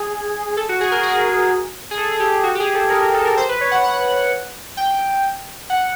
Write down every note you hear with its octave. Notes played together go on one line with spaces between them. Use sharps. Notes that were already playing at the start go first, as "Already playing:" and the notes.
Already playing: G#4
A4
F#4
G#4
A#4
G#4
G#4
A4
G#4
G4
F#4
G4
G#4
A4
A#4
A#4
A4
A#4
C5
B4
C#5
F#5
F#5
G5
F#5